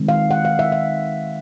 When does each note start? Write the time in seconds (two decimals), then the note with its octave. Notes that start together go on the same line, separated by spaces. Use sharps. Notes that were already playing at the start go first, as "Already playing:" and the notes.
Already playing: D#3 G#3 C4
0.09 F5
0.31 F#5
0.45 F5
0.59 E5
0.72 E5